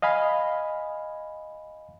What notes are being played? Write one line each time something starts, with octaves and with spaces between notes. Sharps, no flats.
D#5 F5 G#5 B5